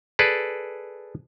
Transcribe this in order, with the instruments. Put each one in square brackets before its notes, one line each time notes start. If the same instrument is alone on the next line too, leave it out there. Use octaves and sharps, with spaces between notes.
[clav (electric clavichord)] G#4 A4 B4 D5